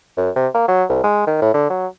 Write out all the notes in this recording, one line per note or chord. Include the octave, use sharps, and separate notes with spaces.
F#2
C3
A#3
F#3
C2
G#3
D#3
A2
D3
F#3